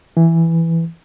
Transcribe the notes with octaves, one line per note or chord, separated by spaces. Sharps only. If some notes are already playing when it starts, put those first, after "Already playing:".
E3